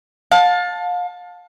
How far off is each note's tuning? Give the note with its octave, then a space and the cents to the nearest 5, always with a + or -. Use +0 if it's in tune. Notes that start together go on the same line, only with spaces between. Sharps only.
F5 +35 A5 +0